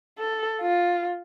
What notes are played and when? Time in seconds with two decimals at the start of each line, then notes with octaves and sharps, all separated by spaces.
0.19 A4
0.61 F4